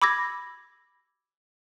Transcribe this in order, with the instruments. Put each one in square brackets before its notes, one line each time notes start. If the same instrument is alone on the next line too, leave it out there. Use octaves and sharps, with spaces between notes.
[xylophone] B5 D6 E6 G#6 A#6